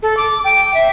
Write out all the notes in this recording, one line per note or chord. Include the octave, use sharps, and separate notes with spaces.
A4
D6
G5
E5